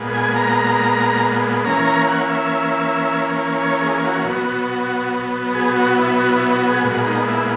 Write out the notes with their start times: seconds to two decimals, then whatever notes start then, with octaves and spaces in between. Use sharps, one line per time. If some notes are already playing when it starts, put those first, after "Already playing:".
Already playing: A#2 G#3 B3
0.14 G#5
0.36 A#5
1.65 E3 A#3 C#4 A#5
1.87 A#5
2.08 F#5
2.30 E5
3.60 C#5
3.82 G#4
4.04 F#4
4.25 B2 F#3 B3 F#4
5.55 G#4
5.76 F#4
5.98 E4
6.19 F#4
6.36 E4
6.52 F#4
6.69 G#4
6.85 A#2 G#3 B3 F#4
7.06 D#4
7.28 E4